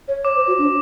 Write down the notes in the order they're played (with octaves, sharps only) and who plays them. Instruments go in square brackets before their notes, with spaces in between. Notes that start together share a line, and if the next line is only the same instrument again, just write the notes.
[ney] C#5
[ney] C#5 [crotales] D6
[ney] C5
F#4
D4